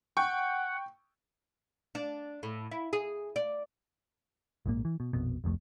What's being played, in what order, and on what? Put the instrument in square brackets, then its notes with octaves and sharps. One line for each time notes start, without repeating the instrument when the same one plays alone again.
[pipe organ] F#5 [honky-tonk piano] G5 C#6
[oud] D4
A2
E4
G#4
D5
[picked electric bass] A#1 G#2 C3 A#3
E3
B2
A#1 F2 B2
F1 C2 F2 A3